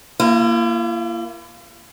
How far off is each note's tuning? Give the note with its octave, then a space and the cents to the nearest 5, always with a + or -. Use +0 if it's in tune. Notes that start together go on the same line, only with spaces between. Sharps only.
A#3 +0 E4 +45